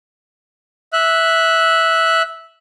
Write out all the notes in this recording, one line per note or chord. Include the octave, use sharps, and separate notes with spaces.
E5 F#6